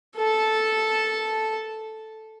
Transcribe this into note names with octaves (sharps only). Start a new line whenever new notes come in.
A4 A5